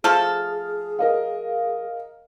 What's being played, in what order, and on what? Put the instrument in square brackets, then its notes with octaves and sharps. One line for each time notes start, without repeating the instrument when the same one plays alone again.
[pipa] F3 A3 A4 [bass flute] G#4 [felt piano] F6
[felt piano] A#4 D#5 F5